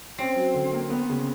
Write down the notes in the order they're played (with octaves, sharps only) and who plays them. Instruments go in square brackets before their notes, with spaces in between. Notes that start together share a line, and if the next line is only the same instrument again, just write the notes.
[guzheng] C4 [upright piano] C#4
[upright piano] F#3
D3
A#3
B3
C#3